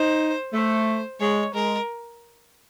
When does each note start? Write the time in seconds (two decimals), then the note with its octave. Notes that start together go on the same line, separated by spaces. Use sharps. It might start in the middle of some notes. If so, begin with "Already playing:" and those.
Already playing: D#4 C5
0.53 A3 C5
1.20 G#3 C#5
1.54 G#3 A#4